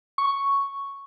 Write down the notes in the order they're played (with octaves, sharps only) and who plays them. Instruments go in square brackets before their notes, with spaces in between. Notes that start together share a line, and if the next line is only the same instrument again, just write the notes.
[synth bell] C#6